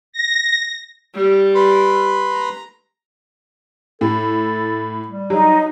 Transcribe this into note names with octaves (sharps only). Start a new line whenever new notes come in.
A#6
G3
B4 B5 C6
A#5
A2 A4
G3
F#3 D#4